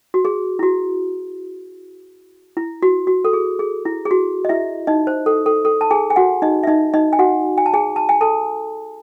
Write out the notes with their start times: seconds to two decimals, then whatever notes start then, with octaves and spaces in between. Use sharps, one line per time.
0.14 F#4
0.25 G#4
0.59 E4
0.63 F#4
2.57 E4
2.82 F#4
3.07 F#4
3.25 A4
3.33 G#4
3.59 G#4
3.85 E4
4.05 G#4
4.11 F#4
4.45 D#5
4.49 E4 E5
4.87 D#4 D#5
5.07 C5
5.26 A4
5.46 A4
5.65 A4
5.81 A5
5.91 G#4 G#5
6.10 G#5
6.16 F#4 F#5
6.42 D#4 D#5
6.63 E5
6.67 D#4 D#5
6.94 D#4 D#5
7.13 G#5
7.19 F#4 F#5
7.58 G#5
7.66 A5
7.74 G#4 G#5
7.96 A5
8.09 G#5
8.21 A4 A5